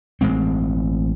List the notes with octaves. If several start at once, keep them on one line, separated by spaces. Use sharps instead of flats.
A1 G#3 C4